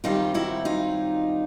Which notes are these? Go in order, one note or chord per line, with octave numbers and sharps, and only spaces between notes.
F#2 D#3 G3 C4 D#4 F4
E4 F#4
D#4 F4